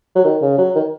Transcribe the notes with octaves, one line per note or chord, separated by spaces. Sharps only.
F#3
D#3
C#3
F#3
D#3